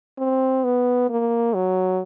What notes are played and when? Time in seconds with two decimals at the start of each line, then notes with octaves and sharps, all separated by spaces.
0.19 C4
0.64 B3
1.10 A#3
1.54 F#3